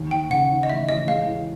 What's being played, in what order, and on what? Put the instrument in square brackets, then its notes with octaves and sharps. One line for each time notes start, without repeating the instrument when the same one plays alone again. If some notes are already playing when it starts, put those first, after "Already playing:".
Already playing: [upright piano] D#2
[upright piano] D#2 [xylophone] G5
[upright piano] C#3 [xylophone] F#5
[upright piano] D#3
[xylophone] D#5
[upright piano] A1 [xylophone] E5
[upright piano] A1 [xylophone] D#5
[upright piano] G#3 [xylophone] F5
[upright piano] E2